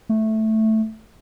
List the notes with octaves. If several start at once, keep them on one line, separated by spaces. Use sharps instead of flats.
A3